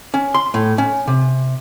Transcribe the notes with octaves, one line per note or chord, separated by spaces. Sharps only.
C#4
C6
A2
C#4
C3